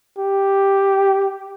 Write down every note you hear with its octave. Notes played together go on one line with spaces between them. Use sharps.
G4